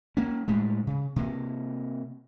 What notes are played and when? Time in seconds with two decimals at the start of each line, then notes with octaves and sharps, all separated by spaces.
0.17 A#3 C#4
0.48 A2 G3 G#3
0.87 C#3
1.16 C3 A#3